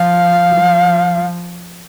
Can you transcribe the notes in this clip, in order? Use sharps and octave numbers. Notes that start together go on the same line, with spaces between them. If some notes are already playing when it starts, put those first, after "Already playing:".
Already playing: F3 F5
F3